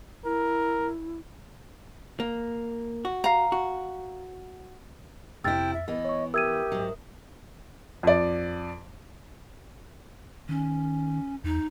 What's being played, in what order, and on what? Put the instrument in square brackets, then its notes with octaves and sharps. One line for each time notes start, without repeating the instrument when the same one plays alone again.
[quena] E4 [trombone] A#4
[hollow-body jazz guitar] A#3
F#4
[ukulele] F5 A#5
[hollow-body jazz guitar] F#4
[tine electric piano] F2 [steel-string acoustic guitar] C3 E4 [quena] G5 [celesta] E6 F6 A6
[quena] E5
[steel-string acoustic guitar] E3 B3 [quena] D#5
[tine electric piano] C#5 C#6
[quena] G4 [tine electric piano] A#4 E5 D#6 [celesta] E6 G#6 D#7
[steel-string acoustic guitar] G#2 F#3
[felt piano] F2 D5
[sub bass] D#3 [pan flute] C#4
[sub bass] E2 [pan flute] D#4